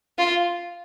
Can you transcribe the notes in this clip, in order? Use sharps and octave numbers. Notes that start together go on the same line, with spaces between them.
F4